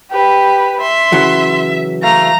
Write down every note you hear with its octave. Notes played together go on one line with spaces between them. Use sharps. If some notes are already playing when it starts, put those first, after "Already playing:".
G4 B4
E5 C6
C#3 E3 F#3
A3 F5 A#5